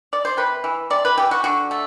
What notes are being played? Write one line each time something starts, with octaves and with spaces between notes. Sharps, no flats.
D5
C5
C3 B4
E3
C3 D5
B4
E3 G4
F#4
D3 F#4
A3